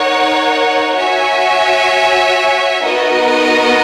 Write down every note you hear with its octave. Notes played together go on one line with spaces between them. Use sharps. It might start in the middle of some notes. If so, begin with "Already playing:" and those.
Already playing: D#4 A#4 C#5 F#5
F#4 C#5 E5 G#5
B3 D#4 F#4 A#4 D#5